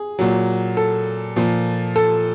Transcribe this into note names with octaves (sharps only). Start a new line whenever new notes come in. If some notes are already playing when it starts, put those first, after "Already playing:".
Already playing: G#4
A#2 F#3
A4
A#2 F3
A4